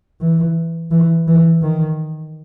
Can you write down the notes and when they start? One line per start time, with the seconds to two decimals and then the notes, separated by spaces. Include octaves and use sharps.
0.21 E3
0.91 E3
1.27 E3
1.62 D#3